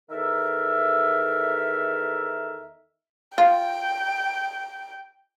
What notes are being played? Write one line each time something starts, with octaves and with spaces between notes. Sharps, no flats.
E2 D#3 A4 A#4 E5
F4 G5